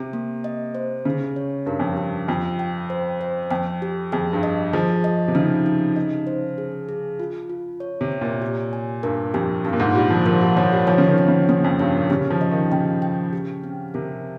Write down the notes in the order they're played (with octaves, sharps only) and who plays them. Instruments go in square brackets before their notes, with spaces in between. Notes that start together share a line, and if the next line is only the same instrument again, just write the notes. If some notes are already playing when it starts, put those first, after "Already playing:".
Already playing: [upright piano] C3
[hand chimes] A#3
D#5
C5
[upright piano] C#3 [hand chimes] G#4
[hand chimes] C#5
[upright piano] G2 [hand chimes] A#4
[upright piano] F2
[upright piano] G2 [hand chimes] G4
[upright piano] F2 [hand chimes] F4
[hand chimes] G5
C5
C5
[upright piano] F2 [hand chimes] G5
[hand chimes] G4
[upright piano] F2 [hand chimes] G#4
[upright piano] G2
[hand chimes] D#5
[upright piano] F3 [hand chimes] G#4
[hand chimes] D#5
[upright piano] C3
[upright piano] C#3 [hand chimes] D#4
[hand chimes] D#4
D#5
C5
G#4
G#4
F4
F4
C#5
[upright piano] C3
[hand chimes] C#5
[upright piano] A#2
[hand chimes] G4
G#5
[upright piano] G2 [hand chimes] A#4
[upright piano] F2 [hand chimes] G4
[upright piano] G2 [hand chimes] C4
[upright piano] A#2
G#2
[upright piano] G3 [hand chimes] F4
[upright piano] F3
[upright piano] F3 [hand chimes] A#4
[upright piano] G3
[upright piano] F3 [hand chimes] C#5
[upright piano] G3
[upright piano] F3 [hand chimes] C#5
[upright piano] C#3
D#3
[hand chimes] C4
[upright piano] C#3
[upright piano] C#3 [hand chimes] A#3
[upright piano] F2
[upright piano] G2 [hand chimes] C#5
[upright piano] A#2
[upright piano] C#3 [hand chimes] G4
[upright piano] F3
[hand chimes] D#5
[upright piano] D#3
[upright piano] C#3 [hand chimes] G5
[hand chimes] G5
G4
C4
[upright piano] C3 [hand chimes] A#4